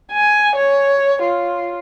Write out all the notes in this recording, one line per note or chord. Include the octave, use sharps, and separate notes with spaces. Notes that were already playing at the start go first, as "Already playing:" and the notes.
G#5
C#5
F4